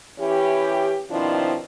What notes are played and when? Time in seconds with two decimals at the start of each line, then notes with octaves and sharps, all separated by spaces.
0.19 E3 C#4 E4 G4
1.10 B2 D#3 F3 C4 D4 E4